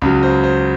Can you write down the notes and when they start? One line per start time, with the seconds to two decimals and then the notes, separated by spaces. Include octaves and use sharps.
0.02 C#2 C#3 F#3
0.23 C5
0.44 C5